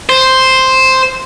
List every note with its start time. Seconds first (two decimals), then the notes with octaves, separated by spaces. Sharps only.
0.09 C5